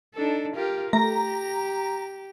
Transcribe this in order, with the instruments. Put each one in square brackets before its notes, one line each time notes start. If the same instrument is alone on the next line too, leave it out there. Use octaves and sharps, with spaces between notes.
[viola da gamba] D4 D#4 A4
F4 G4 A#4
[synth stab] A3 [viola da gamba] G4 [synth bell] A#5